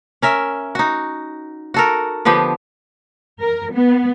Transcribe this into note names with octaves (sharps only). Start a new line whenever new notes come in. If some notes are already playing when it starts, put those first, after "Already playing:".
C#4 A#4 E5
D#4 F#4
F#4 A4 A#4
D3 F3 B3 G4
A#4
B3